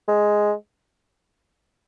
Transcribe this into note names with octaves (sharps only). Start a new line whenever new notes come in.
G#3